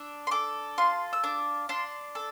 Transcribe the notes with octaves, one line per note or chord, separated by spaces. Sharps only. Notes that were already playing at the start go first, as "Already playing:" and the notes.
Already playing: D4 E6
C6
A4 D6
F4 C6
E6
D4 D6
D4 C6
A4